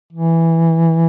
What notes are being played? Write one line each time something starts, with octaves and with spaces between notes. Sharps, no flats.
E3